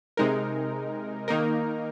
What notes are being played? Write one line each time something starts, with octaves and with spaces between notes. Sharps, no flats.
C3 G#3 D#4 A#4
D#3 A#3 D#4 A#4